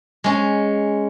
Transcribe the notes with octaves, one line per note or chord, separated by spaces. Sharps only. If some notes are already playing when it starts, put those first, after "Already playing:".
G#3 C#4